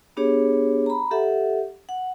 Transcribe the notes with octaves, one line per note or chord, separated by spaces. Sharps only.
B3 D4 G4 G#4 C#5
A#5 B5
G4 A4 E5 F#5
F#5